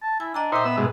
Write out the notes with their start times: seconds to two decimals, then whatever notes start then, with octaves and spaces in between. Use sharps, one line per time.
0.02 A5
0.20 E4 G#5
0.34 D4 D#5 G5 A#5
0.52 A#2 D#4 C5 E5 G5
0.65 B3 E6
0.78 G#2 B2